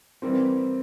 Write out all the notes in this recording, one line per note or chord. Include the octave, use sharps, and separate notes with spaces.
E3 G3 A#3 C4